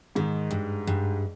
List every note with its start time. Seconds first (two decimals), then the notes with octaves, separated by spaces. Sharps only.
0.15 G#2 D#3
0.51 G2
0.87 G2